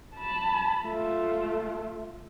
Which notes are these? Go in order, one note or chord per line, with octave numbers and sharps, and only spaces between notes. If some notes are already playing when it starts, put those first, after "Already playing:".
A5 B5
A3 F4